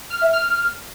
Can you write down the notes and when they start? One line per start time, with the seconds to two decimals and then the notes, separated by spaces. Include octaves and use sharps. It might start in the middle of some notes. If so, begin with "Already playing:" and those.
0.10 F6
0.21 E5
0.33 F6